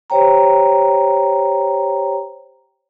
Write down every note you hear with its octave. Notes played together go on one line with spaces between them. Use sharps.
G4 C5 C#5 G5 A#5